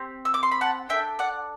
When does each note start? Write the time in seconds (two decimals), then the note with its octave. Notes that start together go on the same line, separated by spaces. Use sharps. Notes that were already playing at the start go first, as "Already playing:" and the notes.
Already playing: C4 G4
0.25 E6
0.34 D6
0.43 C6
0.51 B5
0.61 F#5 A5
0.89 D4 A4 E5 G5
1.19 D5 F#5